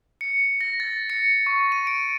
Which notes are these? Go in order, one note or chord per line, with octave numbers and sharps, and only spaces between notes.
C#7
A#6
A6
C#7
C#6
D#7
D7